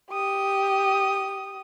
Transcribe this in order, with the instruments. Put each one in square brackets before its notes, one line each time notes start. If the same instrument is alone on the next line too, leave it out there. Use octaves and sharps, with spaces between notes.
[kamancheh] G4 D#6